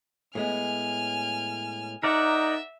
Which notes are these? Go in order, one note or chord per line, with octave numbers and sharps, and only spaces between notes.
A2 G#3 B3 G#5 F6
D#4 A#4 D5 E5 F#5